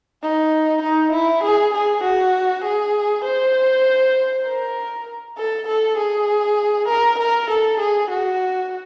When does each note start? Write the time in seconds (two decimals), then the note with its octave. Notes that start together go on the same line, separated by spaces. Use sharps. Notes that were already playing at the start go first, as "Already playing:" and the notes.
0.23 D#4
0.82 D#4
1.13 E4
1.44 G#4
1.74 G#4
2.04 F#4
2.65 G#4
3.25 C5
4.46 A#4
5.38 A4
5.68 A4
5.98 G#4
6.89 A#4
7.19 A#4
7.50 A4
7.80 G#4
8.11 F#4